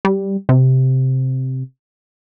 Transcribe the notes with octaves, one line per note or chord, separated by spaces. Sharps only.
G3
C3